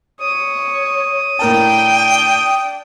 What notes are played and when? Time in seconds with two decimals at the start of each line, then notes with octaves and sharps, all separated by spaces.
0.21 C#5 D#6
1.39 A2 D4 A#4 G5 A5